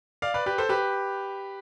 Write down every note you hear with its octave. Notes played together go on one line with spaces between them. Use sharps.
D5 F5
B4 D5
G4 B4
A4 C5
G4 B4